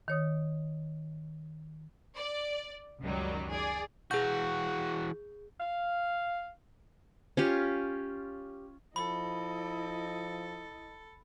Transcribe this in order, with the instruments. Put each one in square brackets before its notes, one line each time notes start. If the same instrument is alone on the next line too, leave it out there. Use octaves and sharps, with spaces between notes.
[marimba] D#3 C#5 D#6
[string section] D5
C#2 F#2 D#3 F#3 G3
G#4 D5
[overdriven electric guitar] E3 F#4 [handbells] G#4 G6
[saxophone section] F5
[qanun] C#4 F4 G4
[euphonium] F3 [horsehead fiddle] E4 D#5 [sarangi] A4 [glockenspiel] B5